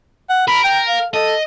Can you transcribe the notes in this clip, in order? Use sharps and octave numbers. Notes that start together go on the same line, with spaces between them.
F#5
A#4 B5
G5
F5
A4 D#5